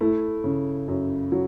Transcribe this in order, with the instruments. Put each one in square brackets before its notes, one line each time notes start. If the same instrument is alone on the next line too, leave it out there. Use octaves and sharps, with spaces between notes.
[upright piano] A3 E4
C#3
F#2
F#3